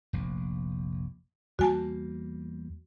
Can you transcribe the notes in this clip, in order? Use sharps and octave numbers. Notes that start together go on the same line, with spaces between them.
F1 A#1
E2 G3 A#3 F#4 G#5 A5